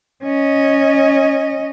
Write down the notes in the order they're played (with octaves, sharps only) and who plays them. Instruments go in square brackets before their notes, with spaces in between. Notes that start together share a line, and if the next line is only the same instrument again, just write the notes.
[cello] C#4 D#5